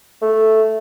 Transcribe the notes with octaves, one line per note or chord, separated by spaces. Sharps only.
A3